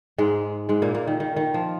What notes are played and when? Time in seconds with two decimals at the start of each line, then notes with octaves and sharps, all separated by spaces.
0.18 G#2 G#3
0.69 G#2 G#3
0.82 A#2 A#3
0.94 A#2 A#3
1.07 D#3
1.20 D#3
1.36 D#3
1.54 F3